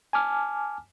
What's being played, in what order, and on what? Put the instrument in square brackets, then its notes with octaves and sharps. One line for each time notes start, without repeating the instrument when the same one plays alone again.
[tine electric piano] G#5 A5 D6 F6